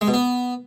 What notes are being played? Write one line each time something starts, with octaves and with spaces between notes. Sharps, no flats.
G#3
B2
B3